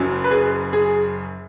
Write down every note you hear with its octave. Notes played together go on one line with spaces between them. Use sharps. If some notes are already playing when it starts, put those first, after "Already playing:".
Already playing: F#1 F#2 F#3
B4
G#4
G#4